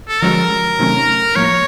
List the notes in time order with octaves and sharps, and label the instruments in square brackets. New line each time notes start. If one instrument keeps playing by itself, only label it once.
[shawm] A4
[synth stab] D3 F3 G#3 C#4 F#4 [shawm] A#4
[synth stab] C3 D#3 F#3 A3 C#4
[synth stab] A2 F3 A#3 [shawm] C#5